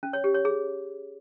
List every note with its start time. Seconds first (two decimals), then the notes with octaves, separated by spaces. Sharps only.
0.03 C#4
0.13 C#5
0.24 G4
0.34 C#5
0.45 G#4